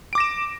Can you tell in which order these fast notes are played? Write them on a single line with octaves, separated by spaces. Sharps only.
D7 D6 A#6 E7